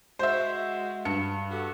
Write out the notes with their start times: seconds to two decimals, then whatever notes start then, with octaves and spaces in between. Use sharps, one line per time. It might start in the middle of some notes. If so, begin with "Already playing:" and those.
0.19 G#3 F#4 C5 E5
1.05 G2 C#7
1.50 F#4 G4 A4